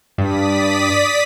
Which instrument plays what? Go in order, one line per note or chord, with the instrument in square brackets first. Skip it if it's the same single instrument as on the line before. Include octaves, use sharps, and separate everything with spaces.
[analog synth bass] G2 [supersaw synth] D5 D#6 B6